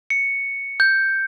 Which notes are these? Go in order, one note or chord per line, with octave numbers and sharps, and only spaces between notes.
C#7
G6